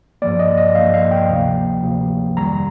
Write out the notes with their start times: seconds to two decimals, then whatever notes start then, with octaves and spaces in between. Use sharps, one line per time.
0.22 G2 F3 A#3 D5
0.39 D#5
0.57 D#5
0.75 G2 F3 A#3 F5
0.94 F5
1.11 G5
1.29 D2 C3 F3 A#3
1.83 D2 C3 F3 A#3
2.37 F2 D#3 G3 A#5